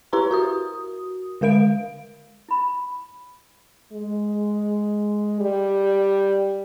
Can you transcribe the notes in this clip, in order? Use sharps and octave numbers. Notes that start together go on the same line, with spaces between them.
E4 G4 B4 A#5 C6
F#4 A#4 D#6
D3 G#3 A#4 F5 D7
E4 B5
G#3
G3